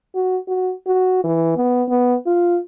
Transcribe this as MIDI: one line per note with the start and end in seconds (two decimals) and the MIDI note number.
0.15 0.38 66
0.48 0.73 66
0.87 1.20 66
1.24 1.56 52
1.57 1.83 59
1.89 2.15 59
2.27 2.59 65